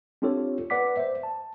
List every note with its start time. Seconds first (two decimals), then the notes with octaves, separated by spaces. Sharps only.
0.22 C4 D4 F4 G4 A4 C#5
0.70 B4 D5 F#5 D6 B6
0.97 C5 E5
1.23 A5